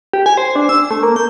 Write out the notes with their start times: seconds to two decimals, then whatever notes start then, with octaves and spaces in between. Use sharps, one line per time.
0.13 G4
0.26 G#5
0.37 C5
0.56 D4
0.69 E6
0.91 A3
1.03 A#3
1.16 G6